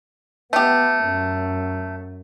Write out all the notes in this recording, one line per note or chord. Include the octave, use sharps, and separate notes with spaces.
A3 B3 G4
F#2